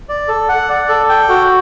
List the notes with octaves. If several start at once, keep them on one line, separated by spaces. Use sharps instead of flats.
D5
A4
F#5
D5
A4
G5
F#4